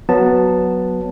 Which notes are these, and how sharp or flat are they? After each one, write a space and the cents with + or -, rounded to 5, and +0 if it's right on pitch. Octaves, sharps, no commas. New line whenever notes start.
F#3 +0 B3 +0 A5 +0